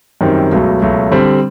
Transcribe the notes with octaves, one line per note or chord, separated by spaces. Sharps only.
F#2 D#3 G3 C4
C#2 B2 F#3 A3
C#2 B2 F#3 A3
D3 G3 C4